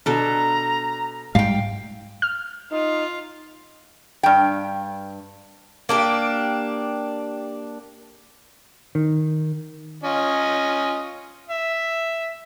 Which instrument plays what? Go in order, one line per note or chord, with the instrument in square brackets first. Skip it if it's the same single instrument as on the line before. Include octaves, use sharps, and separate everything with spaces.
[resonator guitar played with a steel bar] B2 [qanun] D4 A4 [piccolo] A#5
[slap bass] G#2 G3 [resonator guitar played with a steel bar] F5 G5
[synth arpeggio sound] F6
[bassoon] D#4 [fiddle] F4
[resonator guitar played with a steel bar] G2 G5
[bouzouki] A#3 D4 G4
[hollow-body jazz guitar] D#3
[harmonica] C#4 F4 D#5
E5